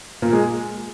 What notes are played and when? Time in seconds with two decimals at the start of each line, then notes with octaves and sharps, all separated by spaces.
0.22 A#2 A#3
0.33 G#3